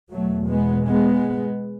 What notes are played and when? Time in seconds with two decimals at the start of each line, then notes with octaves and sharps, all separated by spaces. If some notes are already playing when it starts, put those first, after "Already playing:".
0.13 E2 B2 F#3 A3
0.49 G#3 B3
0.87 G#3 B3